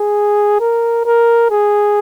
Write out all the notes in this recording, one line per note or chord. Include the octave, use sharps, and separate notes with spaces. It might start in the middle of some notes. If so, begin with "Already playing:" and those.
Already playing: G#4
A#4
A#4
G#4